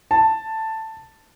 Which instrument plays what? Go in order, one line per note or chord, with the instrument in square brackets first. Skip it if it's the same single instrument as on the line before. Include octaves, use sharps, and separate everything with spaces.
[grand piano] A5